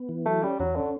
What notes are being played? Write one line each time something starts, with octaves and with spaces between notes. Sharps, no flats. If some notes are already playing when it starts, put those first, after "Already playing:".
Already playing: B3
E3
F#3 A3
G3 C#4
E2 F#3
D3 C#4